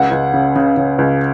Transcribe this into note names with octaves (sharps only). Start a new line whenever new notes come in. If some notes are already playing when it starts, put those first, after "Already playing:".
Already playing: C#2 F#5
C#2
C#3
C#3
C#3
C#2